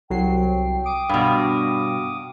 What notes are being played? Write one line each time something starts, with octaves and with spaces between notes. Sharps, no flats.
C2 F#3 G5 C7
D6 D#6 D7
G2 B2 F5